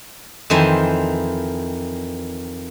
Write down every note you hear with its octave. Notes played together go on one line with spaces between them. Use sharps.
F2 D#3 E3 C5 G#5